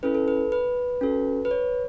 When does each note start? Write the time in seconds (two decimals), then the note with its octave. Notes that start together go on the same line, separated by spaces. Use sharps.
0.03 C#4 E4 A4 B4
0.15 A4
0.28 B4
0.52 B4
1.01 C#4 F#4 A4
1.45 B4
1.51 C#5